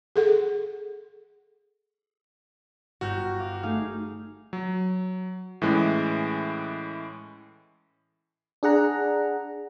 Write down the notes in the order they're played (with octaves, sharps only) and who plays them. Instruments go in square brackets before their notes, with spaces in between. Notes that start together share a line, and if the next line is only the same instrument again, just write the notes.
[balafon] G#4 A4 F#5
[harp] G1 F6 G6 [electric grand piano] F#4
[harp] F5 D6
[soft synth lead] A3 [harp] D#4 G#4 F5
[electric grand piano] F#3
A2 E3 G#3 C#4
[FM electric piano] D4 G#4 F#5 A#5